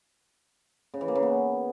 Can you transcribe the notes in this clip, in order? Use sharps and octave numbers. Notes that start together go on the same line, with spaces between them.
C#3
E3
A#3
C#3
B3